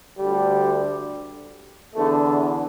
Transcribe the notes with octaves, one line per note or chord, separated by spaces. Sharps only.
D2 D3 G3
E2 D3 A3